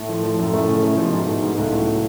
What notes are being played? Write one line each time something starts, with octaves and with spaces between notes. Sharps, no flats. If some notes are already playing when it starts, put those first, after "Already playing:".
Already playing: A2 A3
F3
F3
F#2 A2
A3
C#3
A3
B2 F3
G#2
A3
G#2
C#2 A2
F#3